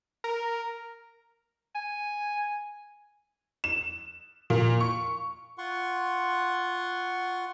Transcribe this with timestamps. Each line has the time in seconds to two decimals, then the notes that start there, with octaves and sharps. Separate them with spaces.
0.24 A#4
1.75 G#5
3.64 E7
4.50 A#2
4.80 C#6
5.58 F4 F#5 C6 C#6